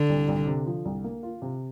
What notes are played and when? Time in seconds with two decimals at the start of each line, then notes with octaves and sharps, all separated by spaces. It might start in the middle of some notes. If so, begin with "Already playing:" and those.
Already playing: D3
0.09 C2
0.28 C2
0.47 C3
0.66 F3
0.85 C2
1.04 A#3
1.23 F4
1.42 C3